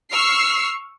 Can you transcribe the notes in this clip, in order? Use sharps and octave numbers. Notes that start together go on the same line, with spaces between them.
C#6 E6 F6 C7